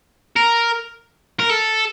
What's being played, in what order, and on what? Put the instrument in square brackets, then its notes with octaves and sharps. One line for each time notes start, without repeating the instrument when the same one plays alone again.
[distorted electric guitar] A#4
A#4
A4